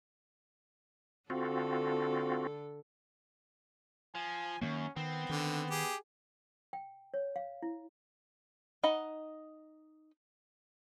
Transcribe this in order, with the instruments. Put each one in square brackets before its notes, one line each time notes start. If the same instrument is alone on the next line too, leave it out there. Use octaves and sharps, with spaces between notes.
[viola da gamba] D3 A4 [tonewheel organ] C4 F4 F#4
[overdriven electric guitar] F3 [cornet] G#5
[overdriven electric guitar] F#2 [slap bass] D#3 F3 A#3 [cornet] C#4
[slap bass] D#3 [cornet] B3 [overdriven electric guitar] C4
[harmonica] D3 [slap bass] D#3
[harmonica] G4 G#4
[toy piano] G5
C#5
F5
E4
[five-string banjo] D#4 D#5 F#5 B5